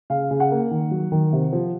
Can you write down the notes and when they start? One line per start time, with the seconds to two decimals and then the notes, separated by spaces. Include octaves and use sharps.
0.10 C#3 F5
0.31 C#3
0.40 F#5
0.51 A#3
0.71 D#3
0.91 F#3
1.12 D#3
1.33 C3
1.53 F3